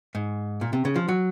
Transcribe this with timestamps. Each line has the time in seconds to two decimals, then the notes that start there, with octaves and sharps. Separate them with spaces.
0.15 G#2
0.61 A#2
0.73 C3
0.85 C#3
0.96 F3
1.08 F#3